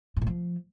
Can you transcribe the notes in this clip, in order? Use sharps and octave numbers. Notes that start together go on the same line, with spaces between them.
G#2
A2
F3